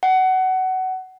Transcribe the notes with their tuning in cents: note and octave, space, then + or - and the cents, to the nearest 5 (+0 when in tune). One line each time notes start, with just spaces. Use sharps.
F#5 +20